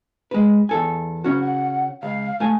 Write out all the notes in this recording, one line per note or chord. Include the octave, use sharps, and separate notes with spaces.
G#3 B4
E2 A4 G#5
C#3 C#4 F#4
F#5
C#2 F5
A3 G#5